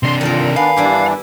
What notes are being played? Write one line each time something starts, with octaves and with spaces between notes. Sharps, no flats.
C3 D4 C6
A#2 D#3 A4 A#4
B3 D4 F5 G#5 B5
G2 E3 G3 D4 E4 G4